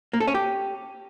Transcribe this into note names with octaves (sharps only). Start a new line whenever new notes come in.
A#3
A4
C#4
G4